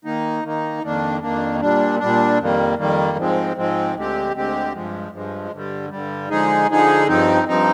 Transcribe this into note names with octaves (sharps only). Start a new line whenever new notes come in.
D#3 A#3 D#4
D#3 A#3 D#4
F2 D#3 A#3 D4
F2 D#3 A#3 D4
A#2 G3 D4
A#2 G3 D4
F2 D#3 G3 A#3
F2 D#3 G3 A#3
G#2 F3 G#3 C4
G#2 F3 G#3 C4
D2 D3 G#3 C4 G4
D2 D3 G#3 C4 G4
G2 F3 G#3
G2 F3 G#3
G2 D3 G3
G2 D3 G3
D3 F3 G#3 D#4 G#4
D3 F3 G#3 D#4 G#4
G2 F3 C4 D#4
G2 F3 C4 D#4